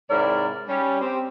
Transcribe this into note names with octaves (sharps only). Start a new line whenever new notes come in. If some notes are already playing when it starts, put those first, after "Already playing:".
G#2 C3 E4 A#4 C#5 D5
G3 C#4
C4 G4